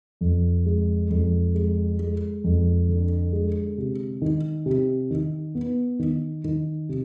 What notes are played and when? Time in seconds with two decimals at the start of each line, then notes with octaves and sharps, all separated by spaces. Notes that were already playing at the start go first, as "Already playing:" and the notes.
0.21 F2
0.66 G#3
1.10 F2
1.55 G#3
1.99 G#3
2.44 F2
2.89 D3
3.33 G#3
3.78 C3
4.22 D#3
4.66 C3
5.10 D#3
5.55 B3
5.99 D#3
6.44 D#3
6.89 C3